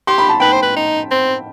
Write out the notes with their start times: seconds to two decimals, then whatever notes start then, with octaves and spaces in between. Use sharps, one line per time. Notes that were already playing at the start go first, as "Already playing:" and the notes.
0.07 G4 C6
0.18 B5
0.29 A5
0.40 B4 G5 B5
0.52 C5
0.63 B4
0.76 D#4
1.11 C4